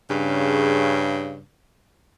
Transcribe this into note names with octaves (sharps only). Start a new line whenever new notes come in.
G2 C#3